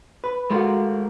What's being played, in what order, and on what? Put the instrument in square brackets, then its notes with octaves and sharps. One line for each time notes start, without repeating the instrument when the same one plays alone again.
[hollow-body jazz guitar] B4
[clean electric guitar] G#3 A#4 [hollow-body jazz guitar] A3 F4 F#4